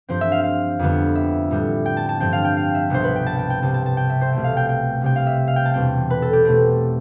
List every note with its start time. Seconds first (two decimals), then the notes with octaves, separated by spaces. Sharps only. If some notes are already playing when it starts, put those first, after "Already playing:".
0.09 G2 F3 C4 C5
0.21 E5
0.32 F5
0.44 F5
0.79 F2 D3 G3 B3
1.15 E5
1.51 A2 G3 B3
1.86 G5
1.97 A5
2.09 A5
2.20 G2 F3 C4 G5
2.33 F5
2.45 G5
2.57 F5
2.75 E5
2.90 C2 B2 G3 B3 C5
3.04 B4
3.16 G5
3.26 A5
3.39 G5
3.50 G5
3.62 C2 C3 G3 C4 A5
3.74 A5
3.86 A5
3.97 G5
4.10 E5
4.21 C5
4.33 C2 B2 A3 C4 G5
4.44 F5
4.57 G5
4.69 G5
5.01 C2 C3 G3 G5
5.16 F5
5.27 E5
5.48 F5
5.56 G5
5.65 A5
5.74 E2 B2 G3 C4 G5
6.10 B4
6.22 A4
6.33 G4
6.45 B2 A3 C4